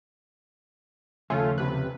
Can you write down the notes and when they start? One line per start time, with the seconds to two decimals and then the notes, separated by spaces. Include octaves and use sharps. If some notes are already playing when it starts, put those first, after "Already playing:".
1.30 D#2 C#3 F3 A3 C#4 F4
1.58 C3 B4